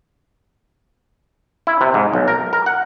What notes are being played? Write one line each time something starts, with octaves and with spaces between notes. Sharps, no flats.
E4
C3
G#2
B1
A#4
A#4
F#5